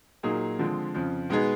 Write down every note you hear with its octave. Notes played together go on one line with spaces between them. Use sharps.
A#2 F#3 A#3 D#4 G#4
D3 F3 G#3 C4
F2 C#3 F3
B2 G#3 B3 D#4 G#4